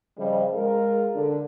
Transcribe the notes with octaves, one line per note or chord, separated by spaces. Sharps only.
C#3 F3 G3 C5 D#5
G#3 F4 A#4
D3 D4